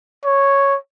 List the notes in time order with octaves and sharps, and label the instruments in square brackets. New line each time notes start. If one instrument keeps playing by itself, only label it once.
[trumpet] C#5